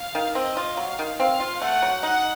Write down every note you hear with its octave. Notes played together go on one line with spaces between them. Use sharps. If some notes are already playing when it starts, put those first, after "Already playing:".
Already playing: F5
D#3
C4 D#5
F4
F#3 F5
D#3
C4 F5
F4
A3 F#5
F#3
D#4 F#5